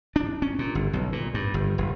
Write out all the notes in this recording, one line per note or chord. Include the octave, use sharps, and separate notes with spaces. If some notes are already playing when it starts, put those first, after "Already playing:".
D4
C#4
A#2
G1
B1
A#2
G2
G1
F1